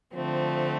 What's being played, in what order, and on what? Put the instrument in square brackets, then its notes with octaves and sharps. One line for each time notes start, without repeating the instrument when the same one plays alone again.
[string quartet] D3 A3 C4 [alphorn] F3